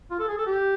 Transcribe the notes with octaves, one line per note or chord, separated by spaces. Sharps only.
F4
A4
G#4
A4
G4